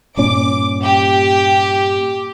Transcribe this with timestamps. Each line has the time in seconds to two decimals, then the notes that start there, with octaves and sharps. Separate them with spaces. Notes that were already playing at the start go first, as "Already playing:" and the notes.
0.17 G2 A#2 C#4 D6
0.83 G4